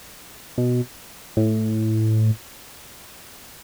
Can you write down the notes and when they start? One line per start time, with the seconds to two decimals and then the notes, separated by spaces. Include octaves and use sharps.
0.58 B2
1.37 A2